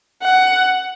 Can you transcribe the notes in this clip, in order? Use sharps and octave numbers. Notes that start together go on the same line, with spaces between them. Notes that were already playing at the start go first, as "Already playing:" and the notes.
F#5